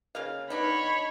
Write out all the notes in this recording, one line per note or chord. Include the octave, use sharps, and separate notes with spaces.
C#3 A#3 F5
B3 D4 D#4 C#5 B5